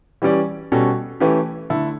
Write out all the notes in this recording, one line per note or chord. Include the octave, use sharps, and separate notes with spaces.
E3 G3 C#4 G4 D5
B2 G3 C#4 F#4 A4
E3 A3 C#4 G4 B4
D3 A3 E4 A4